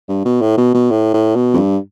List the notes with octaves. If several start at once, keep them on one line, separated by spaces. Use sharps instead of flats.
G2
B2
A2
B2
B2
A2
A2
B2
F2
G2